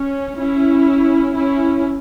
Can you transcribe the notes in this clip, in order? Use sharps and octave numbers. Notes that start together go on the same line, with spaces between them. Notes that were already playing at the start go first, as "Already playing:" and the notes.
Already playing: C#4
C#4 E4
C#4 E4